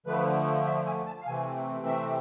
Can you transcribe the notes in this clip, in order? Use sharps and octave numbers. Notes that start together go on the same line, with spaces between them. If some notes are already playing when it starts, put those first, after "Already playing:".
D3 F3 A3 B4
E5
G#5
A5
F5
C3 E3 A3 C4 G#5
E5